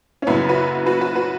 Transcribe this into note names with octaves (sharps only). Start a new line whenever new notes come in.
C#4
F#2 C#3 F#3 B3 E4
F#4 B4
F#4 B4
F#4 B4
F#4 B4